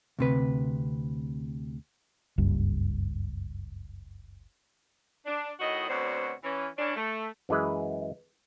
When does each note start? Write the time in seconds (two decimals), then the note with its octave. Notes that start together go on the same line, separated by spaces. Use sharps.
0.19 D2 C3 B4
2.38 F#1 C#2 G2
5.26 D4
5.59 A2 D#3 F#4 D#5
5.89 D2 B2 C4 F#4 C#5 D5
6.43 E3 C#4
6.78 E3 C#4 D4
6.96 A3
7.49 F#2 E3 G#3 B4